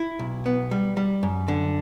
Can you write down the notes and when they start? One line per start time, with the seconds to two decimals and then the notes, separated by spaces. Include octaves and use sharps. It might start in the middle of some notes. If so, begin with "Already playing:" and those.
Already playing: E4
0.19 B1
0.46 B3
0.71 G3
0.97 G3
1.23 F#2
1.48 D3